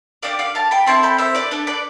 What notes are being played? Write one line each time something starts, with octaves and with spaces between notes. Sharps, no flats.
D4 G4 D5 F5
D5 F5
F5 A5
G5 B5
C4 E4 A4 A5 C6
G5 B5
C5 E5
B4 D5
D4 A4
B4 D5